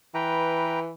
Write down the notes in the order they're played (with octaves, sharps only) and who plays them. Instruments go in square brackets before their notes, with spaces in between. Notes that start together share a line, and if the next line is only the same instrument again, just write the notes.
[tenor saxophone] E3 [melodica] B4 G5 A#5